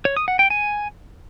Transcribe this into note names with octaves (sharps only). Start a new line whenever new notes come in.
C#5
D#6
F#5
G5
G#5